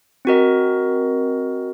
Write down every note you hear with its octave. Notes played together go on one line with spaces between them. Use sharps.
C4 F#4 A#4 D#5